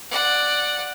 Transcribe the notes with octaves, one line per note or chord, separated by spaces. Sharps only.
D5 F#5